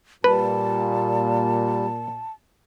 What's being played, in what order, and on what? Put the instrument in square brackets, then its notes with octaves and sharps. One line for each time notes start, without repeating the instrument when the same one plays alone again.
[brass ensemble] A#2 [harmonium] G3 [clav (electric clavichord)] B4 [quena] A5